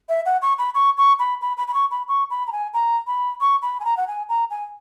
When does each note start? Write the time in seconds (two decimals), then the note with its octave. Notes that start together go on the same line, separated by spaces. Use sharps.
0.09 E5
0.26 F#5
0.42 C#6
0.58 B5
0.75 C#6
0.97 C#6
1.19 B5
1.41 B5
1.57 B5
1.68 B5
1.74 C#6
1.91 B5
2.08 C#6
2.30 B5
2.47 A#5
2.52 G#5
2.74 A#5
3.07 B5
3.41 C#6
3.62 B5
3.80 G#5
3.85 A#5
3.97 F#5
4.07 G#5
4.29 A#5
4.50 G#5